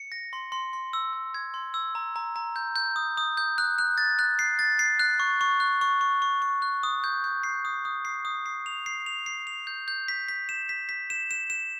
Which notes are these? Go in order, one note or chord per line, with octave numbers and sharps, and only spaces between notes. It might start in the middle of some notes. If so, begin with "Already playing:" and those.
Already playing: C#7
A#6
C6
C6
C6
E6
E6
G#6
C6
E6
A#5
A#5
A#5
G6
G6
D#6
D#6
G6
F#6
F#6
A6
F#6
C7
A6
C7
F#6
C#6
C#6
F#6
C#6
C#6
C#6
C#6
F#6
D#6
G6
G6
C7
D#6
D#6
C7
D#6
C7
F7
C7
F7
C7
F7
G6
G6
B6
B6
E7
B6
B6
E7
E7
E7